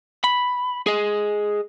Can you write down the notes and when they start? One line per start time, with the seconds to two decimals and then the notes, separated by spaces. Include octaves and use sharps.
0.24 B5
0.87 G#4 D#5